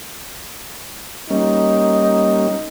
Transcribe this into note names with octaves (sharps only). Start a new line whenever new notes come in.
G3 A#3 C#4 D#4